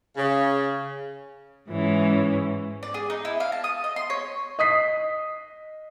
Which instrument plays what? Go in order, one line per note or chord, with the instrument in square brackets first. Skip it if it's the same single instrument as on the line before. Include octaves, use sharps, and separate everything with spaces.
[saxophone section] C#3
[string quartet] G#2 E3 C#4
[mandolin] D5
G#4
D#4
E4
F5
A5
D#6
D#5
C6
C#5
[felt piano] D#5 D#6 B6 C7